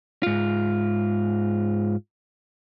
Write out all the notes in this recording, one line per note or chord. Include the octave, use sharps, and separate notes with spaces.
G#2 F4